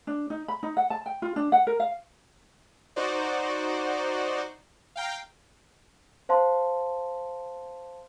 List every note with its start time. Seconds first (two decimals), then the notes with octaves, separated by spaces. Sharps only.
0.07 D4
0.30 D#4
0.48 B5
0.63 D#4
0.77 F#5
0.90 A5
1.06 G5
1.22 F4
1.36 D4
1.52 F#5
1.67 A#4
1.80 F5
2.96 D#4 F#4 C5 D5
4.96 F5 G5 A#5
6.29 C5 F5 A5 C6